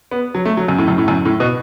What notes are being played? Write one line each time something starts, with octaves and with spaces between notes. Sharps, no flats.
B3
F#3
A3
F#3
F#2
A2
F#2
A2
F#2
A2
B2